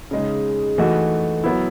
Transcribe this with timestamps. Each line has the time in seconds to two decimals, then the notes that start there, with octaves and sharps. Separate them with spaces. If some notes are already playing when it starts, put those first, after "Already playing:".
0.11 C#3 G#3 D#4
0.78 E3 A3 D#4 F#4
1.44 F#3 B3 E4